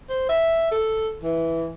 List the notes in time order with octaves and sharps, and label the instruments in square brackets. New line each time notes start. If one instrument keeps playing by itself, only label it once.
[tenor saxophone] C5
E5
A4
E3